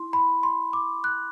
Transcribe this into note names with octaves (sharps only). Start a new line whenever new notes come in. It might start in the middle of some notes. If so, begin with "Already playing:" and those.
Already playing: E4 C6
B5
C6
D6
F#6